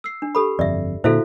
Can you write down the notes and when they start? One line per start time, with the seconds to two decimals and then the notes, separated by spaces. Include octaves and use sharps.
0.04 E6 C7
0.22 D4
0.35 G4 A4 B5
0.59 G1 F2 D5 E5
1.04 A#2 D3 E4 F#4 A4 C5 E5 F5